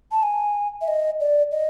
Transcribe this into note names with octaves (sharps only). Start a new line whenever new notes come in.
A5
G#5
E5
D#5
D5
D#5